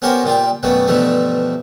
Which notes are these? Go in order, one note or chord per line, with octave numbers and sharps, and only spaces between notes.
B3 C#4 F#4 G4 A#4 C5
A#2 G3 F4 G4
F#2 B2 G3 A3 B3
G2 B2 D3 E3 F3 A3